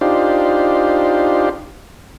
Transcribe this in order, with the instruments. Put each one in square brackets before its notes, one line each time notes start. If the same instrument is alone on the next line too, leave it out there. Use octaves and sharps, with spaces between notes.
[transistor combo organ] D4 D#4 F4 G4 C5